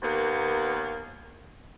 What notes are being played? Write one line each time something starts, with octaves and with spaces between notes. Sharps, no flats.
D#2 A#3 B3